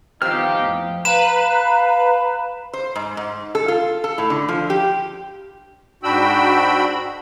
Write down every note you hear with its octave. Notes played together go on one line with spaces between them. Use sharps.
D#3 F3 B3 C4 D#4 G4 F5 F6
F2 A2
B4 F5 A#5 E7
C5
G#2
G#2
A4
F4
A4
A2
D3
F3
G4
G#2 D4 F#4 G5 B5 E6